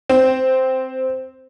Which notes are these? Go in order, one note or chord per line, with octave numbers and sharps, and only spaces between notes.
C4